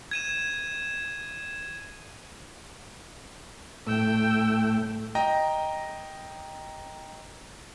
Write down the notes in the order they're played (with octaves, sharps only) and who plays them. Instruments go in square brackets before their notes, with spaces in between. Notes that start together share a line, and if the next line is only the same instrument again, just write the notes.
[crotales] G#6 D#7 E7
[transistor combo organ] A2 A3 [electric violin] G5 E6
[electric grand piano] D#5 G5 A#5 A#6